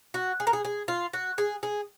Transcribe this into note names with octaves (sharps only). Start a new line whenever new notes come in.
F#4
G#4
A#4
G#4
G#4
F4
F#4
G#4
G#4